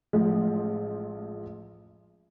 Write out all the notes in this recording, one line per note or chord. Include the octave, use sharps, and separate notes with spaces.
A1 F3 G#3